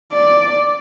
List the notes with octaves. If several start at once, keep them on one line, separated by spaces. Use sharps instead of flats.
D5